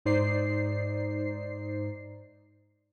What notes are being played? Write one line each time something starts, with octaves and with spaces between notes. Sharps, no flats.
G#2 D#4 C5 D5 C7